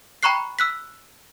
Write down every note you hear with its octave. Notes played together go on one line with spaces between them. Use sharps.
G5 A#5 B5 C#6 F#6 C7
E6 F#6 B6